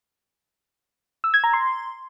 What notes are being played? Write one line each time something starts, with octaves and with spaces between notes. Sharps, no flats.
E6
G#6
A#5
C6